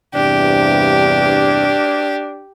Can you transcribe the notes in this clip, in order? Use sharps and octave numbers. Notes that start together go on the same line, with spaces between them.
E2 G2 C3 D4 G4